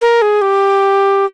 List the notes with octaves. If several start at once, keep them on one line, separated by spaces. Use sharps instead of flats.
A#4
G#4
G4